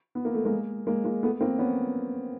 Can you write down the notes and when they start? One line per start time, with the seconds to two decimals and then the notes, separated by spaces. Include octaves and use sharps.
0.15 B3
0.25 A#3
0.34 A3
0.45 G#3 A#3
0.87 G#3 A#3
1.04 G#3 A#3
1.23 A3 B3
1.41 A#3 C4
1.59 B3 C#4